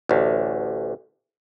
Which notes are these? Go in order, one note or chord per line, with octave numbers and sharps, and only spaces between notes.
A1 D2